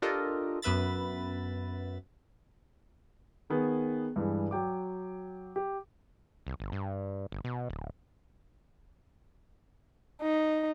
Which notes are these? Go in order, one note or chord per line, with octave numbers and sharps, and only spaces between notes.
D4 F4 G4 A4 A#4 D#5
F#2 B3 B4 E5 B5 A6
D#3 B3 G#4
G2 E3 G#3
F#3 G5 D6
G4
C2
G1
G2
G1
B2
D1
D#4